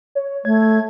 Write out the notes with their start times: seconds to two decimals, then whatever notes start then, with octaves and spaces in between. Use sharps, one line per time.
0.15 C#5
0.45 A3 G#6